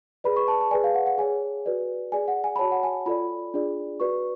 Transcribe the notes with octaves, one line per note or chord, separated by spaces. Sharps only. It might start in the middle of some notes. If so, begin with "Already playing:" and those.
G#4 B4 D5 B5
C#6
A5
A5
G#4 B4 D5 G#5
F5
F#5
F#5
G#4 C#5 G#5
F#4 B4 D5
G#4 D5 G#5
F#5
G#5
B5
F#4 C#5 A5
F#5
G#5
F4 A4 D5 B5
D4 F4 G#4 D5
F#4 B4 D5 C#6